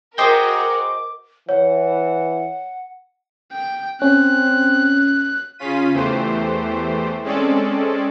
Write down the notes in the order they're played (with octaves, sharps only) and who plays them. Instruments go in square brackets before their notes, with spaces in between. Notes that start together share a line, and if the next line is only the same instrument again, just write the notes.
[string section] F#4 A#4 [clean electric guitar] G#4 G5 [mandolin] C5 D#5 [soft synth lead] D6
[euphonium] E3 [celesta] C#5 [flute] F#5
[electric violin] G5
[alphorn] C4 [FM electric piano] C#4 [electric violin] F#6
[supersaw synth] C#3 C#4 F4 B6 D#7
E2 E3 A3 G4 C5
G#3 C4 C#4 A4 D5